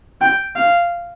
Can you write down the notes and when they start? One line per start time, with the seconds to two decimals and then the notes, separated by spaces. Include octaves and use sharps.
0.21 G5
0.56 F5